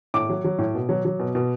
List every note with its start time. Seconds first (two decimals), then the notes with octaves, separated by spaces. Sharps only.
0.14 A2 D6
0.29 F#3
0.45 F#3
0.59 A2
0.75 B2
0.89 F#3
1.05 F#3
1.19 B2
1.35 B2